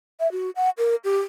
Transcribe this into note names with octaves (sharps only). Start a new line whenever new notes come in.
E5
F#4
F#5
A#4
G4